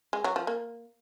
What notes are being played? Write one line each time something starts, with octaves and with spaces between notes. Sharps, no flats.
G#3
F#3
F3
A#3